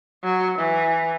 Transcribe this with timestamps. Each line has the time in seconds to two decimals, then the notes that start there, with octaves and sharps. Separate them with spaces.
0.24 F#3
0.58 E3